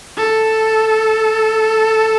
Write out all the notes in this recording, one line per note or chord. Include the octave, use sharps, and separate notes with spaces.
A4